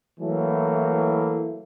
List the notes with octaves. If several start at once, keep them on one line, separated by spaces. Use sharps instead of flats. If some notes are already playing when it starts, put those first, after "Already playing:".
E3 F#3 A3 A#3 E4